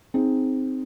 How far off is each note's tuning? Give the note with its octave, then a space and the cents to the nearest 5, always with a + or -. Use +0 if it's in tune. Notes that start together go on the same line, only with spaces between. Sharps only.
C4 +0 D#4 +0 G#4 +0